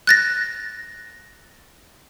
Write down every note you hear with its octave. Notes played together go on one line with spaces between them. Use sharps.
F#6 A6 A#6